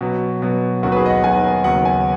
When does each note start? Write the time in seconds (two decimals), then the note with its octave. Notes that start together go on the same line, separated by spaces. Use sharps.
0.01 B2 F#3 B3
0.42 B2 F#3 B3
0.83 D#2 D#3 F#3 B3 F#4
0.92 B4
0.96 G#4
1.06 D#5
1.10 F#5
1.23 D#2 D#3 F#3 B3 G#5
1.64 D#2 C#3 F#3 B3 F#5
1.85 G#5